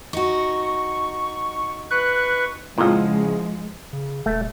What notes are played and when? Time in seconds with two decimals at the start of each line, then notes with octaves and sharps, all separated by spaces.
0.13 D#4 F#4 C#6
1.91 B4 C#6 F#6
2.78 F2 A#2 C#3 F3 G#3 E4 F4 F#5
3.93 C#3
4.26 D#1 A3